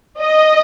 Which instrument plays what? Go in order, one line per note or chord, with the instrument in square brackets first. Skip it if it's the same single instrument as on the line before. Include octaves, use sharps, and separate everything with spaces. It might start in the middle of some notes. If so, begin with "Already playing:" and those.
[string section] D#5